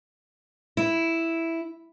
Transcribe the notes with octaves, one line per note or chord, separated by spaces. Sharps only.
E4